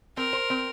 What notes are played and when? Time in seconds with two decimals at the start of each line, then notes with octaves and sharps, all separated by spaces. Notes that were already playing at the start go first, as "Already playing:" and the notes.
0.17 C4 A#4
0.33 C5
0.50 C4